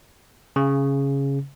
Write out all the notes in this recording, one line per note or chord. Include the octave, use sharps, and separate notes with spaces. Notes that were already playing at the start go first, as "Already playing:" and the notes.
C#3